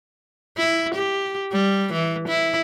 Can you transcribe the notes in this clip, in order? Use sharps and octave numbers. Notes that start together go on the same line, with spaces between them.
E4
G4
G3
E3
E4